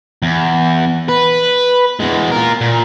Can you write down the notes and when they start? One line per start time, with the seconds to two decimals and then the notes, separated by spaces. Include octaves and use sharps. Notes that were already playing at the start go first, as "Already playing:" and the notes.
0.22 E2
1.09 B4
2.00 E2 G#3
2.32 F4 A#4
2.61 A#2